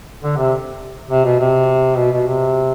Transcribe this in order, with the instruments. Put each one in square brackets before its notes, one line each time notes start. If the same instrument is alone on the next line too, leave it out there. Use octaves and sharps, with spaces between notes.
[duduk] D3
C3
C3
B2
C3
B2
B2
C3